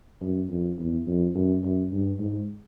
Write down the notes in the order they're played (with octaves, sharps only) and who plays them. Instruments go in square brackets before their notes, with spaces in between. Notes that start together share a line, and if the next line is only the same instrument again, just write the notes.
[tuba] F#2
F2
E2
F2
F#2
F#2
G2
G#2